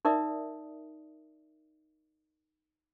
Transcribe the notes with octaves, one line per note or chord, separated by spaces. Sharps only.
D#4 A#4 D5 E5 D#6